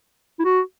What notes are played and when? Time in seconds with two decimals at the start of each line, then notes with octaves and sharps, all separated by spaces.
0.39 E4
0.45 F#4